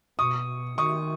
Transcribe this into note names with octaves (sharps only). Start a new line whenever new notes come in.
B2 C#6 D#6
D#3 C#6 D#6